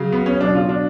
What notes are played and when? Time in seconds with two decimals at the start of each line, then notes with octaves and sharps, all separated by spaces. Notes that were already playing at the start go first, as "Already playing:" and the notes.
Already playing: C#3 F#3
0.12 B3
0.26 C#4
0.41 B2 F#3 D4
0.55 F4
0.69 D4